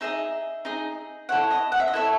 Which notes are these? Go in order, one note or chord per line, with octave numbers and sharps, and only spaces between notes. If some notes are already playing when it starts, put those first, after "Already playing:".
D#4 G#4 D#5 E5
D#4 G#4 D#5
E4 A4 C#5 F#5
D#5
F#5
E5
D#5
E4 A4 C#5 E5